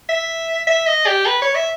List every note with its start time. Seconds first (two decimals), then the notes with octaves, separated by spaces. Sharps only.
0.09 E5
0.67 E5
0.87 D#5
1.07 G4
1.26 B4
1.42 C#5
1.55 E5